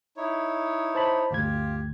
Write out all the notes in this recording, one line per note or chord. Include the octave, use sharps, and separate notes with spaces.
D#4 E4 C#5
C5 A5 B5
G1 D2 F4 G4 G#6